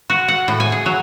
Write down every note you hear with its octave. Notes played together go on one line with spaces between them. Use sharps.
F#4
F#5
A2
G#5
G#4
F#3